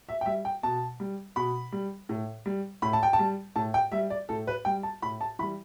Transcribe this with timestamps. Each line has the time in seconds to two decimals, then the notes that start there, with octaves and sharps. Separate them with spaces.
0.09 E5
0.21 G5
0.26 G3 E5
0.45 G5
0.63 B2 A5
1.00 G3
1.36 B2 B5
1.72 G3
2.09 A2
2.46 G3
2.82 A2 B5
2.93 A5
3.03 G5
3.13 A5
3.19 G3
3.56 A2 A5
3.74 G5
3.92 G3 E5
4.10 D5
4.29 A2 A4
4.47 B4
4.65 G3 G5
4.83 A5
5.02 A2 B5
5.21 A5
5.39 E3 B5
5.42 G3